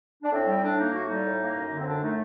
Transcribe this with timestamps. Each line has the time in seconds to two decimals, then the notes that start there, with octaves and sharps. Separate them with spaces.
0.23 D4
0.31 A2 C4
0.47 G3
0.63 A2 D4
0.78 A#3 D#4
0.93 A2 F#4
1.09 G3 D#4
1.25 A2
1.41 A#3
1.56 F#2
1.72 D3
1.79 C4
1.86 F#2 D4
2.02 A3 D#4